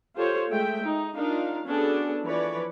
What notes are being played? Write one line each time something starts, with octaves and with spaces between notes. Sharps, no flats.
F4 G4 A4 C5 C#5
G#3 A3 E5 G5
D#4
D4 D#4 F4 A#4 F5
B3 C#4 D4 F#4 G#4 A4
E3 F3 B4 C#5 D5